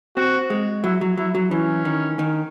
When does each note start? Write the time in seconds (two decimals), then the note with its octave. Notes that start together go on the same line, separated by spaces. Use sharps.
0.17 C4 F#4
0.50 G#3
0.84 F#3 E4
1.01 F#3
1.17 F#3 E4
1.35 F#3
1.51 E3 C#4
1.85 D#3
2.19 D#3